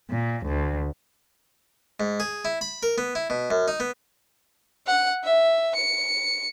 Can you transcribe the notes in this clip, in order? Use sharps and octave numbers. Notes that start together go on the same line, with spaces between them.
A#2
D2
G#2
G#4
E4
B5
A#4
B3
E4
B2
F#2
D#4
B3
F#5
E5
C#7